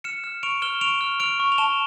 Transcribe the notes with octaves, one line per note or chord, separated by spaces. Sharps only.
F6 C#7 E7
F6
C#6 D7 F7
F6 E7 G7
C#6 D7 F7
F6
F6 D7 F7
C#6
F7
A5 E7 G7